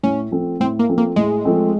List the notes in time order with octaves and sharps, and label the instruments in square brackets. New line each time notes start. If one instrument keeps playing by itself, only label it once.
[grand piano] A2 [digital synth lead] C#4
[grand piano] F3 A3 C4
[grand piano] A2 [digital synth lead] C4
[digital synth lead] A#3
[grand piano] F3 A3 C4
[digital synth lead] A#3
[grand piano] A2 [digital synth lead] G#3
[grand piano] F3 A3 C4